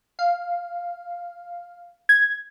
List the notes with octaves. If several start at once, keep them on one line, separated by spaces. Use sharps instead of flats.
F5
G#6